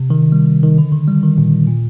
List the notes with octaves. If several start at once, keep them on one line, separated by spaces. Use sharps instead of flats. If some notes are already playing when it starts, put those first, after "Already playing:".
Already playing: C3
D#3
G3
D#3
D3
D#3
G3
D#3
A#2
A#2